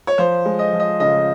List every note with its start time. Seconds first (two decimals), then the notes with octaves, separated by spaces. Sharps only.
0.07 C#5
0.18 F3 C5
0.45 G#3
0.59 D#5
0.73 F3
0.80 D#5
1.00 C#3 D#5